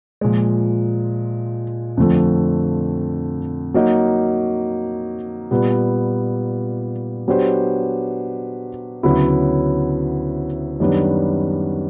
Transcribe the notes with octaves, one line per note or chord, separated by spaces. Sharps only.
A#2 F3 G#3
F2 D3 F3 A3 C4
F#3 A#3 D#4 F#4
A#2 G3 B3
F#3 B3 D4 G4 C5
D2 C#3 F#3 B3 E4
F#2 D#3 G3 B3 D4